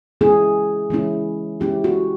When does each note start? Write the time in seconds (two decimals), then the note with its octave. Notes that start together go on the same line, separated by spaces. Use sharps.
0.21 E3 G#3 C#4 E4 G#4
0.90 E3 G#3 C#4 E4
1.60 E3 G#3 C#4 E4 G4
1.84 F#4